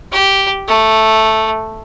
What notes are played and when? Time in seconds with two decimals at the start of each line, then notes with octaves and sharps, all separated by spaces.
0.12 G4
0.68 A3